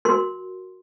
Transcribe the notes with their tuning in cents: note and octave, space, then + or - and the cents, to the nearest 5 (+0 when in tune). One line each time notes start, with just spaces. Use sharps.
F#4 +0 A#4 +0 C6 +0